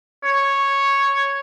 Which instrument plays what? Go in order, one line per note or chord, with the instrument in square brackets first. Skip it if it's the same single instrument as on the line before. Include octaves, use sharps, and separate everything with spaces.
[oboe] C#5